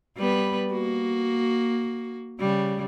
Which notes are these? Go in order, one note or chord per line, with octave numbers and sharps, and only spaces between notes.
G3 B3 B4
A#3 F#4
C#3 G3